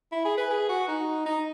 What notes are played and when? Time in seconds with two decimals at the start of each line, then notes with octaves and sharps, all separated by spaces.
0.12 E4
0.25 G#4
0.37 B4
0.50 G#4
0.69 F#4
0.88 D#4
1.26 D#4